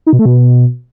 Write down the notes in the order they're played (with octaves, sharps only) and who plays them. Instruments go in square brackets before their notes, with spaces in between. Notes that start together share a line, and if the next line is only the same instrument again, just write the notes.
[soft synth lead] D#4
B2
A3
B2